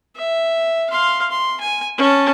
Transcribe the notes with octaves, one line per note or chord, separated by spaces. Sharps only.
E5
F5 C6
C6
G#5
C#4 A5